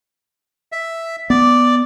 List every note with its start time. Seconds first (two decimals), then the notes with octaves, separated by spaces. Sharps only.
0.72 E5
1.30 B3 D5